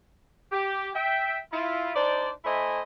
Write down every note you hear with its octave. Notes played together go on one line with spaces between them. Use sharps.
G4
E5 G5
E4 F4
D4 D#4 C5 D5
A3 E4 C5 D#5 G#5